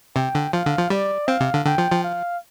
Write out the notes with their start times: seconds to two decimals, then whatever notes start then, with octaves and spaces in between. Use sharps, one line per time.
0.16 C3 G5
0.35 D3
0.53 F3 F5
0.66 D3
0.78 F3
0.90 G3 D5
1.28 C4 F5
1.40 C3
1.54 D3
1.66 D3 G5
1.78 F3
1.91 F3
2.04 F5